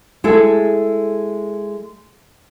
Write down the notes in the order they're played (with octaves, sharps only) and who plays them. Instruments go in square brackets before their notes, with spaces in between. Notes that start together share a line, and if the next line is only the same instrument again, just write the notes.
[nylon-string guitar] G#3 E4 G#4 A4